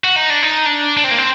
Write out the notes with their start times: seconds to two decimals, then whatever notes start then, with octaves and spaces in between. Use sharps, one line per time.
0.04 F#4
0.16 D#4
0.30 D4
0.43 D#4
0.66 D4
0.97 D4
1.04 C4
1.11 A#3
1.18 C4